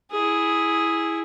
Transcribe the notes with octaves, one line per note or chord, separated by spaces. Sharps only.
E4 G#4